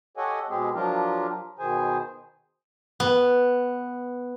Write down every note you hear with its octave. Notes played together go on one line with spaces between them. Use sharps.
G4 A4 C#5 D#5 F#5 G#5
B2 G#3 C4 G4 G#4
F3 F#3 D4 F4 G4 A#4
B2 D#3 G#4 C5 G#5
B3